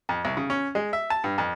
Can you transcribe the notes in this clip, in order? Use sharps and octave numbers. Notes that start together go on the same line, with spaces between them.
F2
C2
C#3
C#4
G#3
E5
A5
G2
F2